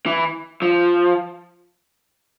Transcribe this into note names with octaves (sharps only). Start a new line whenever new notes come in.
E3
F3